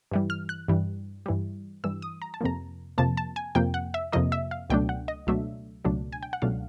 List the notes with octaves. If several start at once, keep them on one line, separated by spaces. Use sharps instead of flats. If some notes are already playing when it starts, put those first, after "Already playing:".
G2 E3 G3
F6
F#6
G2 E3 G3
G2 E3 G3
G2 E3 G3 E6
D#6
A#5
A5
F2 C3 F3 A#3 A#5
F2 C3 F3 A#3 A5
A5
G#5
F2 C3 F3 A#3 G5
F#5
E5
F2 C3 F3 A#3 D#5
E5
F5
C#2 B2 F#3 A3 D4 G5
F#5
D#5
C#2 B2 F#3 A3 D4 E5
C#2 B2 F#3 A3 D4
G#5
G5
F#5
C#2 B2 F#3 A3 D4 F5